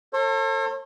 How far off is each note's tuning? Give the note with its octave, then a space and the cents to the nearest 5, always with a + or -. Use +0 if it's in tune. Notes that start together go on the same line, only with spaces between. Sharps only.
A4 +35 C#5 -45